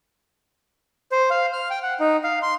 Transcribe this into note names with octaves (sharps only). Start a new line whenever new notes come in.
C5
F5
F6
G5
F#5
D#4
F5
C6